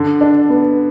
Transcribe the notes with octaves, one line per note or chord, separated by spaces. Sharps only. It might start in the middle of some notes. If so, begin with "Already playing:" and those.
Already playing: D3
D4
B3